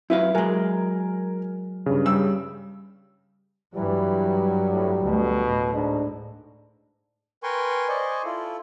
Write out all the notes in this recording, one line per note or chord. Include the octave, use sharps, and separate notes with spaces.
F#2 E4 B4 F5
F#3 G#3 A#4 G#5
G2 C#3
G3 E6
G2 E3 F#3 G3
A2
D2 B2
A2
G#2 D4
A#4 B4 G5 G#5 C6 C#6
C5 D5 D#5 G#5 C#6
E4 F4 A4